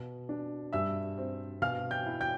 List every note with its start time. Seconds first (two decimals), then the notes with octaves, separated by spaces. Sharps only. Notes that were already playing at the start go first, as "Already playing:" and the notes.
Already playing: B2
0.29 D4
0.73 G2 E5 E6
1.18 C4
1.62 B2 F5 F6
1.91 G5 G6
2.06 E4
2.21 G5 G6